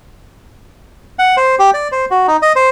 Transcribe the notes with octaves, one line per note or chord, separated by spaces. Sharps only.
F#5
C5
G4
D5
C5
F#4
D#4
D#5
C5